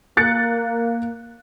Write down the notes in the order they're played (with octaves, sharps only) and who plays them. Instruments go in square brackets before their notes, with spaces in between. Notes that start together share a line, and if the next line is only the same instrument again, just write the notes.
[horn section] A#3 [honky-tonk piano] F#6 A6 C#7